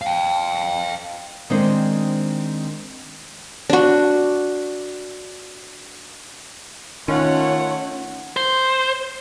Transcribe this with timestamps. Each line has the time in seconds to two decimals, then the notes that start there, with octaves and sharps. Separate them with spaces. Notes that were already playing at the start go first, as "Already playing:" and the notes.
0.02 F5 G5
1.50 D#3 G#3 C4 D4 C5
3.70 D4 F#4
7.08 D#3 A3 C#4 F4 C#5 F#5
8.36 C5